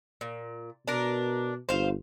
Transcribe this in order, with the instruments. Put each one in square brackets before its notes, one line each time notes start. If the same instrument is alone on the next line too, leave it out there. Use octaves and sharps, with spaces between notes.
[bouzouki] A#2
[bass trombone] B2 [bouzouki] D4 A#4
[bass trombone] G1 [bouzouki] C5 F5